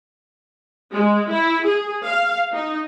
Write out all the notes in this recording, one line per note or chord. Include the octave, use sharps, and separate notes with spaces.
G#3
E4
G#4
F5
D#4